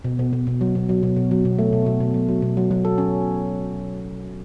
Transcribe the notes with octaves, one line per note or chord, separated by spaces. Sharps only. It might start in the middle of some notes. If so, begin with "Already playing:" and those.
B2
B2
B2
B2
F#3
B2
F#3
B2
B2
F#3
B2
A3
B2
B2
B2
F#3
F#3
B2
F#3
F#3
A4
C#4